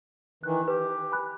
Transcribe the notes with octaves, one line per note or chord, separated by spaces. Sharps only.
D#3 E3 F#6
G4 B4
G#5 B5 F#6